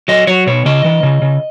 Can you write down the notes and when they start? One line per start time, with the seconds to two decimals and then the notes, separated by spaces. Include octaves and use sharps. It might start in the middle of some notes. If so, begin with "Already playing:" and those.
0.08 F#3 D#5
0.27 F#3 C#5
0.47 B2 C#5
0.65 C#3 D#5
0.84 E3
1.03 C#3
1.22 C#3